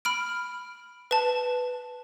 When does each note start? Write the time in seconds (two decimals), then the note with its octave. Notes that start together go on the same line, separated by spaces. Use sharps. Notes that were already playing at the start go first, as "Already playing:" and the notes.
0.05 B5 F6 D7
1.11 B4 A5